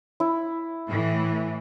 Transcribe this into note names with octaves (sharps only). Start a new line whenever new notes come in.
E4
A2 E3